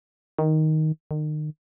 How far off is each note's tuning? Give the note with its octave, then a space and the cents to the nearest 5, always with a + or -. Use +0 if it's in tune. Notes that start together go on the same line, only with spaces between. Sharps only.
D#3 +5
D#3 -35